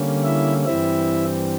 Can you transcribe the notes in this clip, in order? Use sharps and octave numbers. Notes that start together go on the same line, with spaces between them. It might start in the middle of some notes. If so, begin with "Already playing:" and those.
Already playing: D3 G3 A#3 C#4
E4 E5
G2 E3 G3 C4 E4 E5